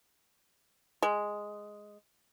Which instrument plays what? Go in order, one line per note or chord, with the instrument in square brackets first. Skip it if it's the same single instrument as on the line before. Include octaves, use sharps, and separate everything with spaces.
[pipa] G#3